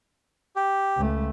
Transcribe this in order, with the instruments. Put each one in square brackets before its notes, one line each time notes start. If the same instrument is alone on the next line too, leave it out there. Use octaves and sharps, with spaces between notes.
[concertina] G4
[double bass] C#2 A3